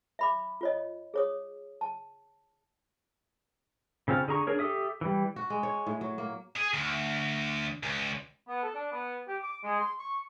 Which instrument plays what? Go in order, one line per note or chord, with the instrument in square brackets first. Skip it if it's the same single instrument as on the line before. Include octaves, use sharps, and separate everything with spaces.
[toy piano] E5 B5 D6
F4 C#5 D#5
G#4 C#5 D#6
A5
[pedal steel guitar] C#3 C4 F4 F5
D3 G#4 A#5 C#6
D4 G#4 A#4 C#5
G4 A4 E5 D#6
E3 G3
[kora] F#4
G#3
C#5
A2
F#3
A#3
[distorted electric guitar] G#4
D2
C#2
[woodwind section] B3
A4
D4
B3
G4
D6
G#3
C6
C#6